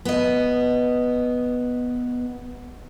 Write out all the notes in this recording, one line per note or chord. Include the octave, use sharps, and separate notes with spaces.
B3 D#5